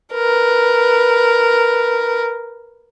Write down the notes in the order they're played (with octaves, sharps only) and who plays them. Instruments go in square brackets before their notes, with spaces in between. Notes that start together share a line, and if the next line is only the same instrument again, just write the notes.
[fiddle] A#4 B4